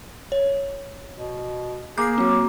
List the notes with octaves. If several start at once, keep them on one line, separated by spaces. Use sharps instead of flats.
C#5
B2
A#3 G#4 G6 C7
F#3 C4 F#4